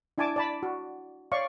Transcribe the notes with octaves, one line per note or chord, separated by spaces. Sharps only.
D4 E4 G#5 A5 D6
D5 A5 B5
F#4
C#5 D5 F5 C#6